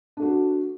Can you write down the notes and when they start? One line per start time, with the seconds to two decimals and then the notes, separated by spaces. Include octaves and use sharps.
0.17 D4
0.20 A3
0.22 F#4